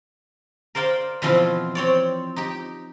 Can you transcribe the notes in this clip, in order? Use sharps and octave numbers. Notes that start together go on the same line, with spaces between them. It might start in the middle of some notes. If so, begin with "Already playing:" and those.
A#4 C5 D5 F5 G5
B2 E3 F3 C4 E4 F4
C4 C#5 D5
D#4 G4